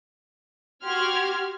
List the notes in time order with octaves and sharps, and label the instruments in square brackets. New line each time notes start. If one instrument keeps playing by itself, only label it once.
[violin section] F#4 G4 C6 F6 G#6